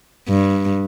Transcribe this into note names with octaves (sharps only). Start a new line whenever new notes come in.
G2